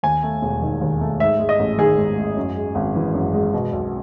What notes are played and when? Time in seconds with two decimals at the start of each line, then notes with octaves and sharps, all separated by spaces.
0.03 D#2 G#5
0.23 A3
0.42 E1
0.62 D#3
0.81 D#2
1.01 A3
1.20 G#2 E5
1.39 G#3
1.49 D#5
1.59 A1
1.78 D#3 G#4
1.98 G#2
2.18 G#3
2.37 F#2
2.56 G#3
2.75 G#1
2.95 E3
3.14 F#2
3.34 G#3
3.53 B2
3.73 B1